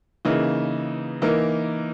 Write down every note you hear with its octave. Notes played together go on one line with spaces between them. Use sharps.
C#3 E3 A#3 D#4
E3 A#3 D#4 A#4